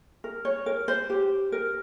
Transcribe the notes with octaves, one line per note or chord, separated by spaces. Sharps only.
A#4
C#5
A#4
C5
G4
A#4